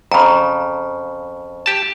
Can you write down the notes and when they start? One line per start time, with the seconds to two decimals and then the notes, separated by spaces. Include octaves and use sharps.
0.12 F2 C#3 A#5 B5
1.66 G4 A5